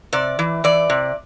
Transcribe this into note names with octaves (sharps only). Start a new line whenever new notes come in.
C3 D5
E3
E3 D5
C3